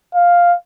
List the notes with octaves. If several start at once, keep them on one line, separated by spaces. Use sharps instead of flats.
F5